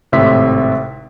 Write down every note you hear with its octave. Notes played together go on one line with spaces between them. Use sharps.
G#1 A2 C3 E5 C6 B6